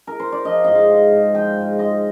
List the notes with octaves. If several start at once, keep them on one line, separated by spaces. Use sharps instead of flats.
A#4
C5
D5
F3 D#5
G#2 D#5
F5
G#3
G#2
F3 G5
G#2
G#3 D#5